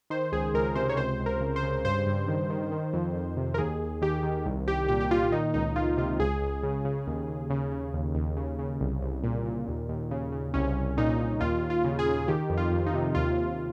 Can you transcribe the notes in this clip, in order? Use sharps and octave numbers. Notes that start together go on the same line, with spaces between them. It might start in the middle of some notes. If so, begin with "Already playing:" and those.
D#3 C5
C#2 G#4
C#2 A#4
C3 C5
C#5
C#2 C5
C#2
A#4
C#3
C5
C#3
G2 C5
G2
D#3
D#3
D#3
F2
F2
C3
A#4
D#2 G#4
D#2
D#3 G4
D#3
C2
C2 G4
A#2 G4
G4
A#2 F4
D#3 D#4
C#2 D#4
C#2 F4
C3 F4
C#2 G#4
C#2
C#3
C#3
D#2
D#2
C#3
C#3
D#2
D#2
C#3
C#3
C2
C2
A#2
A#2
D#2
D#2
C#3
C#3
C2 C#4
C2
A#2 D#4
A#2
D#2 F4
D#2
F4
C#3
G#4
C#3
D#3 G4
F2
F4
F2
D#4
C3
D#2 F4
D#2